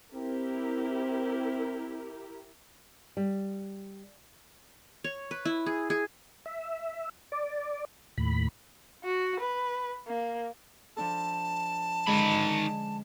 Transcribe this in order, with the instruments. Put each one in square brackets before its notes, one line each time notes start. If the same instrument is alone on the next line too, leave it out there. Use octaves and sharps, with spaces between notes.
[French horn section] C4 [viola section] E4 G4 A#4
[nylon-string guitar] G3
[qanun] C#5
B4
E4
G#4
G#4
[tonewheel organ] E5
D5
D#2 A2 B5
[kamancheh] F#4
B4
A#3
[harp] F3 D4 A4 [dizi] A5
[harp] D3 G#3 C#4 [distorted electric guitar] D#3 B5